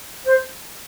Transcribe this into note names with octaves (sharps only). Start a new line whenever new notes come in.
C5